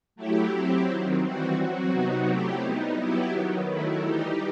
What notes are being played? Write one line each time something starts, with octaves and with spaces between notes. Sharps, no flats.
F#3 A3 E4 G4
F#3 C4 E4 G4
D#3 F#3 C4
E3 G3 C4 F#4
F#3 C4 F#4
C3 F#3 B3 D#4 F#4
F#3 A3 C4 E4 G4
G3 B3 D#4
F#3 B3 E4 G4
D#3 F#3 B3
D#3 F#3 A3 E4
E3 G3 D#4 G4